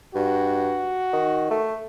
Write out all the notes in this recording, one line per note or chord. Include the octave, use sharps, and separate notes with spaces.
G2 F#4
D#3
A3